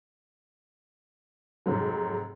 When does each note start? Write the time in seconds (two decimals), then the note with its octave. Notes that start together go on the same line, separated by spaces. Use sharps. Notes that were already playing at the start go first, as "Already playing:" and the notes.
1.66 F1 G#2 F#3